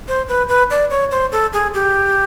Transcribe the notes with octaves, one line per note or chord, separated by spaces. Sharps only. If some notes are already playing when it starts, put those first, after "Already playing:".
C5
B4
B4
D5
C#5
C5
A4
G#4
G4